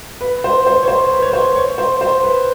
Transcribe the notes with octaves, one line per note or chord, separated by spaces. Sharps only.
B4
C5
C5
C#5
C5
B4
C#5
C5
C#5
C5
C5
B4